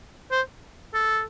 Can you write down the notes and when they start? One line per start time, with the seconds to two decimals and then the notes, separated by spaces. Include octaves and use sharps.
0.31 C5
0.94 A4